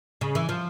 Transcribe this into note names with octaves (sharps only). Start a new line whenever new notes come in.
C#3
E3
F3